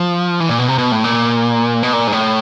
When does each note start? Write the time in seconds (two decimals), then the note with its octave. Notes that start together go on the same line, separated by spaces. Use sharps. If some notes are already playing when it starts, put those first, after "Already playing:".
Already playing: F3
0.40 E3
0.49 A#2
0.59 B2
0.68 C3
0.78 B2
0.92 A2
1.04 A#2
1.83 B2
1.93 A#2
2.07 G#2
2.12 A2